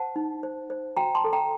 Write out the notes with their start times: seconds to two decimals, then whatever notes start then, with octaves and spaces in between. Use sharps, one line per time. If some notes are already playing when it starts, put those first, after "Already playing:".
Already playing: C5 F#5 A5
0.16 D#4
0.43 C5
0.70 C5
0.97 F#4 G5 A#5
1.15 A5 C6
1.24 A4
1.33 G5 A#5